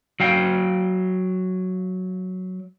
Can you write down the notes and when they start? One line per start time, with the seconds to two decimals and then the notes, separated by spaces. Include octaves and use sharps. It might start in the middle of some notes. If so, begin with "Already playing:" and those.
0.20 F#3 F5 G5